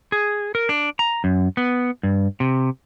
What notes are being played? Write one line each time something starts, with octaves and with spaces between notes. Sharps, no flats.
G#4
A#4
D4
A#5
F#2
B3
G2
C3